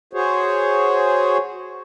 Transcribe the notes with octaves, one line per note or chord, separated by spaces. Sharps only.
F#4 G#4 C5 C#5